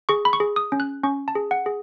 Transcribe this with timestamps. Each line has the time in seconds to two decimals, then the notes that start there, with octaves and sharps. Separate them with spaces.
0.09 G#4 C#6
0.25 B5
0.33 C#6
0.40 G#4
0.56 D#6
0.72 C#4
0.80 F#6
1.04 C#4 C#6
1.28 A5
1.35 G#4
1.51 F#5
1.66 G#4